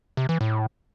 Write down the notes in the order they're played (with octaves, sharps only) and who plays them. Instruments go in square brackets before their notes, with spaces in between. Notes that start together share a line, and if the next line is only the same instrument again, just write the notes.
[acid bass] C3
E3
A2